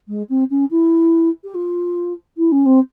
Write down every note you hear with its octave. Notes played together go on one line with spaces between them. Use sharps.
G#3
C4
C#4
E4
G4
F4
E4
C#4
C4